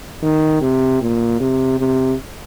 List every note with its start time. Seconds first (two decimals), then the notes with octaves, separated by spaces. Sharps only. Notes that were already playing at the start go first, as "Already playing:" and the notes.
0.22 D#3
0.61 C3
1.01 A#2
1.40 C3
1.79 C3